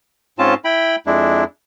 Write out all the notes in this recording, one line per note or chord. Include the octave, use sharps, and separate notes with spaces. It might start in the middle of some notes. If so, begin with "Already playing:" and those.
G#2 C4 C#4 F4 A5
E4 G5 B5
F2 G#3 D4 E4